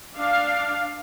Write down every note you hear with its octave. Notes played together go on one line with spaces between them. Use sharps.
D4 F5